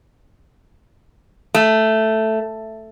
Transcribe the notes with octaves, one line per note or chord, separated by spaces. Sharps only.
A3